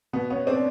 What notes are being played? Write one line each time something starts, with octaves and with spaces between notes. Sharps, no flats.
B2 B3
B3 C#4
C4 D4